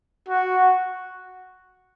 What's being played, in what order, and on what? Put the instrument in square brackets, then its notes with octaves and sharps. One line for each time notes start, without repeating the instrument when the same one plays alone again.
[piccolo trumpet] F#4